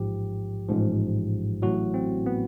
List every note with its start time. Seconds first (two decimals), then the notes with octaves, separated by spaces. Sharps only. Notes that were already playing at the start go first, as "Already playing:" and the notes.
Already playing: A1 G#2 F3 G4
0.68 A1 G#2 F3
1.62 A1 A2 F#3 F#4
1.94 C4
2.26 B3